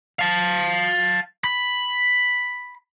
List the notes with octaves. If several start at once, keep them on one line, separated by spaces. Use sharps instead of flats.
F5 A5
B5